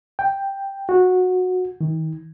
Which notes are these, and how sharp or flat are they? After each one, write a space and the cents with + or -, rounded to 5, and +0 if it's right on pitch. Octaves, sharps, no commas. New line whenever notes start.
G5 +5
F#4 -15
D#3 +40